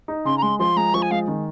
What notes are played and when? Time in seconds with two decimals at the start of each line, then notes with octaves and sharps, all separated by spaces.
0.08 D#4
0.25 C#3 C6
0.38 A#5
0.42 G#3 C6
0.59 F3 C6
0.76 G#3 A#5
0.94 F3 C#6
1.02 G#5
1.11 G#3 F5
1.28 D#3